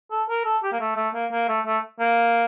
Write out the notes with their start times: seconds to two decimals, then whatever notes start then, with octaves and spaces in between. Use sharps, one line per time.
0.11 A4
0.29 A#4
0.45 A4
0.63 G4
0.72 A#3
0.80 A3
0.96 A3
1.14 A#3
1.31 A#3
1.48 A3
1.66 A3
2.00 A#3